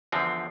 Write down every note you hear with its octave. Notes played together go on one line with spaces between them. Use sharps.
E2 D3 F3 C4